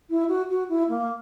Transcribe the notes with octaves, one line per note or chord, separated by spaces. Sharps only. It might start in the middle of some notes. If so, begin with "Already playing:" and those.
E4
F#4
F#4
E4
A#3